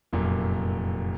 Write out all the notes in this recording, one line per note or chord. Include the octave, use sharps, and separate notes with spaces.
F1 F#2 A#2